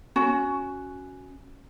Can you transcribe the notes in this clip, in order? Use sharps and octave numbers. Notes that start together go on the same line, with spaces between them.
C#4 F#4